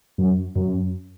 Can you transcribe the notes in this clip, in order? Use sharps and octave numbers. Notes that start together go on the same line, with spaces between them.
F#2
F#2